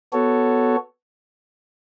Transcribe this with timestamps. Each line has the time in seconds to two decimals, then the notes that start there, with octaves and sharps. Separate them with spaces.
0.13 B3 F#4 A4 C#5